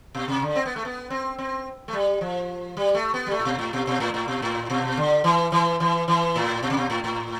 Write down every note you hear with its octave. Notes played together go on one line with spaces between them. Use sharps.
B2
C3
D3
C4
B3
A3
B3
C4
C4
A3
G3
F3
G3
A3
B3
G3
A3
A2
B2
A2
B2
B2
A2
A2
B2
A2
B2
D3
E3
E3
E3
E3
A2
B2
C3
B2
A2
A2